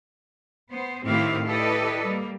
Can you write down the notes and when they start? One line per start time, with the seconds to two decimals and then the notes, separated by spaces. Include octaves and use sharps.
0.73 B3 C5
1.05 A2 D#3 C4 E4 G4 F5
1.46 E4 G4 A4 B4 D5 D#5
2.05 G3 A#3